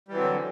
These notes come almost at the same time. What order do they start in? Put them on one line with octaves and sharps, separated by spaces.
G3 E3 F#3 C4 D3